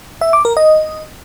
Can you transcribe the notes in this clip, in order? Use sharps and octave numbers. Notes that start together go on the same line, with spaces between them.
E5
D6
A#4
D#5